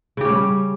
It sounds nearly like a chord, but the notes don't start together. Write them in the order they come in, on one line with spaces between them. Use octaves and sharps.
C#3 G4 C#4 G3